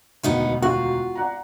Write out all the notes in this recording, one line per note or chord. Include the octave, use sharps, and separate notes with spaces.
E1 D2 D#3 B3 D#4 F5
F4 F#4 F5
D5 F#5 A#5